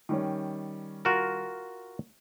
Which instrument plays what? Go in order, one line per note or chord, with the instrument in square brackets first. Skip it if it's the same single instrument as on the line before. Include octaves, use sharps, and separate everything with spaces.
[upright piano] D#3 G3 C#4
[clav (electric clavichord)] F4 F#4 A#4